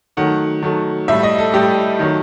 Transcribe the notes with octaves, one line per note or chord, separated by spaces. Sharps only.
D#3 F#3 A3 F#5
D#3 F#3 A3
A2 G3 E5
D#5
A4
A2 G3 G4
D#3 F#3 A3